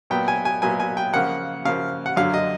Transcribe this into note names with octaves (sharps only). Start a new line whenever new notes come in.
A#2 F#3 B3 G5
G#5
G#5
A#2 F#3 B3 G#5
G#5
G5
C#3 F3 A#3 F#5
C#3 F3 A#3 F5
F#5
F#2 D3 F#3 F5
D#5